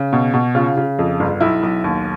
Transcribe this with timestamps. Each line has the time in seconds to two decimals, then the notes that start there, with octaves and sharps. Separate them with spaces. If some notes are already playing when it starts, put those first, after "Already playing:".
Already playing: C#3
0.13 B2
0.34 B2
0.55 C#3 F4
0.77 C#3
0.99 F2
1.20 G1
1.40 B1 E4
1.63 B1
1.84 D#2